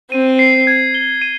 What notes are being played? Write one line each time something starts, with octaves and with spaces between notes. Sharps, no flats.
C4 D#7
C7
G#6
G7
D#7